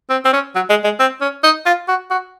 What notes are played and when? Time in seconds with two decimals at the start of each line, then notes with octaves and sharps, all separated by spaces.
0.10 C4
0.25 C4
0.33 C#4
0.56 F#3
0.70 G#3
0.84 G#3
1.00 C4
1.21 C#4
1.44 D#4
1.66 F4
1.88 F#4
2.11 F#4